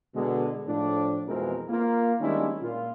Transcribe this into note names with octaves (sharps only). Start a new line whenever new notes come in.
B2 D3 G#3
A2 F3 D4
F2 B2 E3 G#3 C4 A#4
A#3 F4
D#3 G3 G#3 C#4 D4 E4
A#2 F4